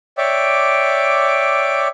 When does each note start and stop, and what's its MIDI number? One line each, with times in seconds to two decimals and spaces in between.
0.18 1.88 73
0.18 1.88 74
0.18 1.88 76
0.18 1.88 79
0.18 1.88 86